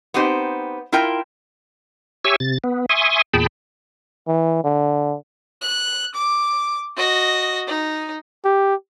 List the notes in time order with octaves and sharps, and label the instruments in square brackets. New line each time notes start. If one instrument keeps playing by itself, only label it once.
[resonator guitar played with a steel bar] B3 C4 D#4 G4 C5
E4 F4 A#4 G5
[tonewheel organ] G4 C#5 E5 G#5 C#6 E6
C3 A6
B3
E5 G#5 C6 C#6 D#6
E2 A#2 G#4 G5 A5 B5
[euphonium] E3
D3
[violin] F#6
D6
F#4 D#5
D#4
[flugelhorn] G4